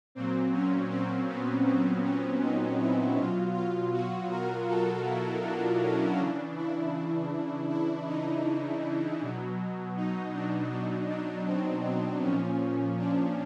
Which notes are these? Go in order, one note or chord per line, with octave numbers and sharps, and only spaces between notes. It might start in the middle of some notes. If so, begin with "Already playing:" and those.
A#2 F#3 C4
C#4
C4
B3
C4
C#4
D#4
E4
B2 F#3 F4
F4
F#4
A#4
A4
E4
D4
C#4
C#3 E3 D4
E4
E4
D#4
B2 F#3
D#4
D4
D4
D4
C4
C4
A#2 F3 C#4
D4